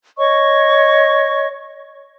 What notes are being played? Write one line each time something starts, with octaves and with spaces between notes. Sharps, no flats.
C#5 D#5 C#6